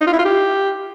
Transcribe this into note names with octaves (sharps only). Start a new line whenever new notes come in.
D#4
F4
E4
F4
G4